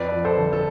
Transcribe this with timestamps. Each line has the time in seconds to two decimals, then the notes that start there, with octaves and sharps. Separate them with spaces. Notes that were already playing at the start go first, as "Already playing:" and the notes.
Already playing: F2 B4 D5
0.12 F3
0.25 A4 C5
0.38 G1
0.53 A4